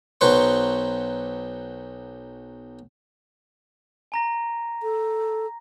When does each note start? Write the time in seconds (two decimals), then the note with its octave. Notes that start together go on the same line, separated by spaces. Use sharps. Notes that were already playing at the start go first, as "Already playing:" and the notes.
0.21 B1 F#3 B4 C5 C#6
4.12 G#5 A#5 A#6
4.83 A4